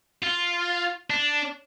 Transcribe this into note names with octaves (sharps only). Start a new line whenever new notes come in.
F4
D4